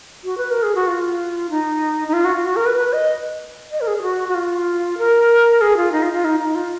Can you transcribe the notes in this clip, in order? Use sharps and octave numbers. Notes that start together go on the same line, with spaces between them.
F#4
B4
A#4
G#4
F#4
F4
D#4
D#4
F4
F#4
F4
F#4
A#4
B4
B4
D#5
D#5
A#4
G#4
G#4
F#4
F#4
F4
A#4
G#4
F4
D#4
F4
F4
D#4
D#4
F4